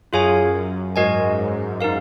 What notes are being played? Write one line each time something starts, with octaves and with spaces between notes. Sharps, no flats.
F#2 F4 G#4 C#5 F5 G#5
F#2
G#2 F#4 A#4 D#5 G#5
F#2
D#4 A#4 F5